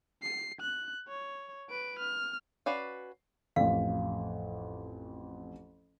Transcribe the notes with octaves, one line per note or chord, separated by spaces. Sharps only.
C7
F#6
C#5
B4 D7
F6
C#4 F#4 B4 D5 F5
A1 F2 F5